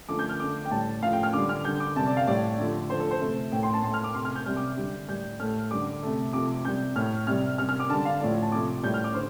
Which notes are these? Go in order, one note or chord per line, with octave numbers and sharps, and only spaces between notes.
D3 F3 A3 D6
G6
F6
D3 A3 D6
G5
A2 G3 A5
A2 F3 A3 F5
G5
F6
D3 G3 D6
F6
D3 G3 G6
D6
C3 G3 A5
D5
F5
A2 G3 D5
D3 F3 A3
D3 F3 A3 C5
A4
C5
C3 A3
A2 A3 G5
C6
A5
A2 A3 C6
F6
D6
C3 A3 C6
F6
G6
C3 G3 F6
D6
D3 G3
A2 G3 G6
A2 A3 F6
D3 G3 D6
C3 A3
C3 F3 A3 D6
C3 G3 G6
A2 A3 F6
C3 G3 F6
C3 G3 F6
F6
D6
D3 G3 A5
F5
A2 F3 A3 D5
A5
C3 F3 A3 D6
A2 G3 G6
F6
D6
D3 C5